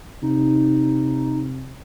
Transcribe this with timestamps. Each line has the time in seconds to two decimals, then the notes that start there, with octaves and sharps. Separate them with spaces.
0.23 C3 D#4